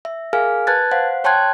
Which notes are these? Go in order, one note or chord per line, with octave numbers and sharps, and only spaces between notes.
E5
G#4 A#4 F5 G#5 F6
B4 A5 F#6 G#6 A6
C5 F5 F#5
C#5 G5 A5 C6 F#6 G#6